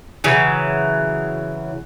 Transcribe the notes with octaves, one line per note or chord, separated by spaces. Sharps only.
C#3 E3 F#3